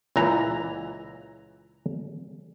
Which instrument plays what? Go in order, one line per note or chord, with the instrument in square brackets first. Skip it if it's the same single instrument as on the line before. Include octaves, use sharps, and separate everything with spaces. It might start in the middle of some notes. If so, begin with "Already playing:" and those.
[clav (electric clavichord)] C#2 A#2 E3 A#5